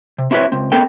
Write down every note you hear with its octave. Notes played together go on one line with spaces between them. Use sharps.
C3
C4 E4 F#4 G4 B4 C#5
C#2 C4
B3 C4 A4 A#4 G5